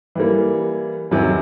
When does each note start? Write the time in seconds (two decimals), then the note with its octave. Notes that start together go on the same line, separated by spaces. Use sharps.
0.15 E3 G3 A#3
1.11 E2 C3 D#3 F#3